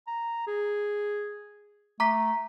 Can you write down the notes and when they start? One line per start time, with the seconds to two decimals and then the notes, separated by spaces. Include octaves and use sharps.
0.07 A#5
0.47 G#4
2.00 A3 A#5 D6 B6